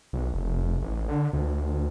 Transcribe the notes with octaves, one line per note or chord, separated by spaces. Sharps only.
B1
F1
A1
D3
D2